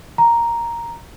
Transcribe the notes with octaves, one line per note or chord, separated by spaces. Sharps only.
A#5